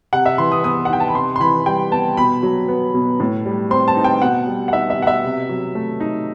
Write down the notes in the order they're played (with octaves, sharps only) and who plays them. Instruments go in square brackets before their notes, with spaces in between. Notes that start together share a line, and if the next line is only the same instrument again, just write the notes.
[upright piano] C3 F#5
E5
E3 C6
D#6
B3 D#6
F#5
D#4 G5
A5
B5
C3 C6
C6
E3 B5
G3 G5
B3 A5
B2 B5
F#3
B3
B2
A2
G3
C4 C6
A5
D#4
G5
B2 F#5
G3
F#5
D#4 E5
E5
B2 F#5
E5
C3
F#3
A3
D#4